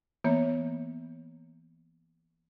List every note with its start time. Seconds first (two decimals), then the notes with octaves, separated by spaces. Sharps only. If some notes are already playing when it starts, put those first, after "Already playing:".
0.24 E3 A#3 B3 C#5